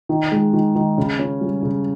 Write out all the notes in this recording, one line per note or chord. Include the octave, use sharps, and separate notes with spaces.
D#3
G#3
D#3
D#3
C#3
C#4
G3
C#3